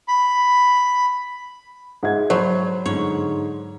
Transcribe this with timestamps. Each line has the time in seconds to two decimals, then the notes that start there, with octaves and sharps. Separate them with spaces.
0.08 B5
2.03 G#2 E5 G#6
2.30 F#3 C5 C#5 B5
2.86 G#2 D3 C#5